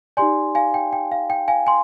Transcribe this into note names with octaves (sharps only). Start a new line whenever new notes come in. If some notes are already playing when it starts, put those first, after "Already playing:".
D#4 G4 D5 G#5 C6
F5 G#5
G5
G5
F5
G5
F5 G#5
G#5 C6